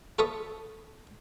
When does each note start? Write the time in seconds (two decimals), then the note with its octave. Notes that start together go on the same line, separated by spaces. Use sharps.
0.19 F4 A4 B4 E5 C#6 D#6